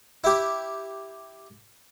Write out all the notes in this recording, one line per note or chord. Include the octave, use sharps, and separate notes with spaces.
E4 G4